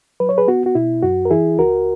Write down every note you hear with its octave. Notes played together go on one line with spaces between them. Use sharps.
F#3 B4
C#5
G#4 B4
B3 F#4
F#4
B2 E4
F#2 F#4
A#4
E3 E4 G#4
C#2 F#4 A#4